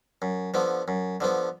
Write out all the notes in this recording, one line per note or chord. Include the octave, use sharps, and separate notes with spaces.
F#2
D3 F3 B3
F#2
D3 F3 B3